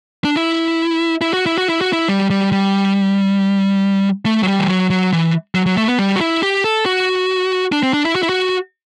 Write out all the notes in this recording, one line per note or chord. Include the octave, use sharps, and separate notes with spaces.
D4
E4
E4
F#4
E4
F#4
E4
F#4
E4
G3
G3
G3
A3
F#3
G3
E3
F#3
F#3
E3
F#3
F#3
A3
B3
G3
F#4
E4
G4
A4
F#4
D4
C4
D4
E4
F#4
E4
F#4